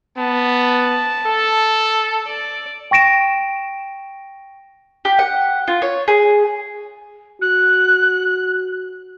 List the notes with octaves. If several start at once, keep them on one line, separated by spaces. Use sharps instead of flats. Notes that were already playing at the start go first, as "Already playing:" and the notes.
B3 A5
A4
D5
G5 C#6 A#6 D7 E7
G4
F#5
F4
C#5
G#4
F#4 F#6